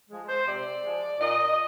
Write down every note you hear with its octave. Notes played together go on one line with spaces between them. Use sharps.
F3 G#3
C5
C3 D5
F3 G#3
A#2 D#5